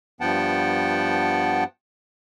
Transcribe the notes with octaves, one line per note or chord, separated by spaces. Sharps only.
G2 F3 B3 F#5 G5 A5